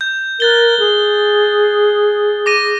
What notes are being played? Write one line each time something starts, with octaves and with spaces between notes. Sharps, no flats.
G6
A#4 F#6 A6 G7
G#4
D6 A#6 D#7